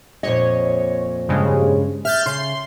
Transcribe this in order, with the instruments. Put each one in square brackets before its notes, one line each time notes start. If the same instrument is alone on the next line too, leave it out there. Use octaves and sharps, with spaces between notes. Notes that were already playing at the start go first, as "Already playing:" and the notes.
[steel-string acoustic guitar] F2 A#2 D#5 [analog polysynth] C#5
[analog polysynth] G2 C#3 G#3
[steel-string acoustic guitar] E5 [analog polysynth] F6 G6 A6
[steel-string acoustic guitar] C#3 [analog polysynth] C6